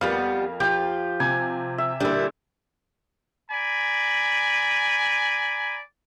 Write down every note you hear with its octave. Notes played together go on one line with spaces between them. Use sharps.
F2 G3 A#3 B3 F4 F5
F3 F4 G4
C3 G#5
E5
A#2 D3 G3 E4
D5 G#5 A#5 B5